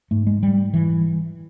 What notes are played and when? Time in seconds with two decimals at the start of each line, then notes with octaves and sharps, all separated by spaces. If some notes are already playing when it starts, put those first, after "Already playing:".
0.11 G#2 A3
0.27 G#3
0.43 G3
0.74 E3